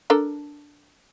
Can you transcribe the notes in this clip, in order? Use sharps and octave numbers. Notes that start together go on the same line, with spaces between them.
D4 A4 A#4